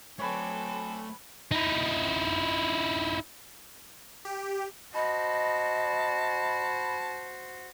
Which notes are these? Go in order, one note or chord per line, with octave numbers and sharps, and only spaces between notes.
F#3 A3 C4 A4 B4 C#5 D5 G#5
D#4 E4
G4
F#4 C5 D#5 A5 B5